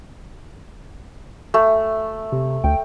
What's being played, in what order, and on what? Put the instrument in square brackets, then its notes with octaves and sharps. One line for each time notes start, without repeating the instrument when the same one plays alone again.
[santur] A3
[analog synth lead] C3
[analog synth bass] D2 [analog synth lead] G5